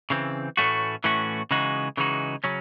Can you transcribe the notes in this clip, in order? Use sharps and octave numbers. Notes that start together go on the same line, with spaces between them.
C#3 E3 C4
A2 E3 A3 C#4 F#4
A2 E3 A3 C#4 F#4
C#3 E3 G#3 D#4 F#4
C#3 E3 G#3 D#4 F#4
C#3 F#3 C#4